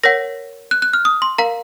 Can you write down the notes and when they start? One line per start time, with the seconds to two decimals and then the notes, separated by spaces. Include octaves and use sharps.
0.03 A#4 C#5 F#5 A#6
0.71 F#6
0.82 F#6
0.93 F6
1.05 D#6
1.22 C6
1.38 A#4 F5 A#5